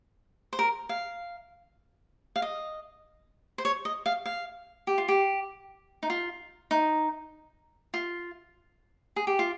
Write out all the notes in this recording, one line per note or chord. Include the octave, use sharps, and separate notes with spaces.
C5
A#4
F5
F5
D#5
C5
C#5
D#5
F5
F5
G4
F4
G4
D#4
F4
D#4
F4
G#4
G4
F4